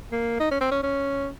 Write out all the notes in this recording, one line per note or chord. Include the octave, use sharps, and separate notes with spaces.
A#3
D#4
C#4
C4
C#4
C#4